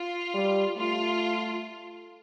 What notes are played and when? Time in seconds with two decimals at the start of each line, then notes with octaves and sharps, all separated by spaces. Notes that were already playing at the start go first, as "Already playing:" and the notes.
Already playing: F4
0.34 G3
0.77 A3 F4